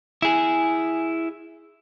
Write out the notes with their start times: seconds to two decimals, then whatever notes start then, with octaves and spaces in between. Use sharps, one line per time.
0.22 E4 G#4